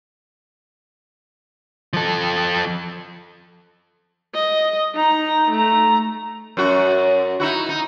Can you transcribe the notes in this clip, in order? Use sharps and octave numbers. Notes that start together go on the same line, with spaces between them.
F3 A4
D#5
D#4 A#5
A3 A#5
F#2 F#4
D#4 E4 F#4
D#4